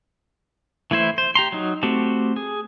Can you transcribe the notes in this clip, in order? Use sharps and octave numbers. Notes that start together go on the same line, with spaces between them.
E3 A3 E4 C5
C5
G4 A#5 C6
F#3 D#4
A3 C4 F#4 G4
G#4